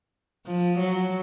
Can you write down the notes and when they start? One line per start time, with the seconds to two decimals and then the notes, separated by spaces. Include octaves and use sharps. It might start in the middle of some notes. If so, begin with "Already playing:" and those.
0.46 F3
0.79 F#3